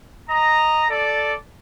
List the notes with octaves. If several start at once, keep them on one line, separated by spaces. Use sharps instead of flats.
D#5 A#5
A4 D5